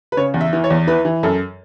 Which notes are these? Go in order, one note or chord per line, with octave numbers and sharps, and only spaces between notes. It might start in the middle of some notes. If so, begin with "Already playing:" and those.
B4
C#3 C#5
E2
E5
E3
C#5
E2
E3 B4
E3
F#2 A4